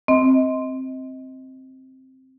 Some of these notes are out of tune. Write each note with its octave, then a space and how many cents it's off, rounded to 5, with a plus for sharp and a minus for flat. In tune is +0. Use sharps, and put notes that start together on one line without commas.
C4 +0 D#5 +25